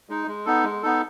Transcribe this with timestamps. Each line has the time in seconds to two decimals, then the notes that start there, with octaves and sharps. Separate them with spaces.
0.09 G#3 D#4
0.27 G#3
0.45 B3 D#4 A4
0.64 G#3
0.83 B3 D#4 A4